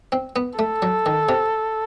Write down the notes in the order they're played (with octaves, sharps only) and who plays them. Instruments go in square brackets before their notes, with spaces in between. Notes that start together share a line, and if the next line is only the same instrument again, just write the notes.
[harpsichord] C4
B3
[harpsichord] A3 [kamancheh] A4
[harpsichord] F#3
D#3
C3